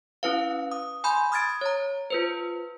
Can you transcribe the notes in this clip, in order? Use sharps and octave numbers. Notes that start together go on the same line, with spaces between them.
C#4 E4 B4 F5
D#6
G#5 B5 C6 G6
D#6 F6 G#6 A6 D7
C#5 A#5
F4 B4 C5